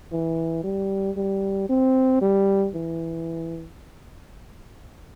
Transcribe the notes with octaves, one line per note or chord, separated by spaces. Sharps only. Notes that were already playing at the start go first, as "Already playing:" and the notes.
E3
G3
G3
C4
G3
E3